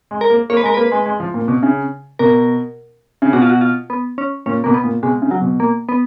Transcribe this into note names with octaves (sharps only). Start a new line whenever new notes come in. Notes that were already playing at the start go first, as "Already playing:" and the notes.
G#3
A#4
A#3
A#3 C#5
B4
G#3
A#4
A#3 B4
G#3
G#3
F3
A#2
B2
C#3
B2 A#4
C#3
B2 F#4
F4
F#4
F4
B3
C#4
A#2 C#4
B2 A#3
B3
A#2
B2 G#3
C#3
F#3
B2
A#3
B3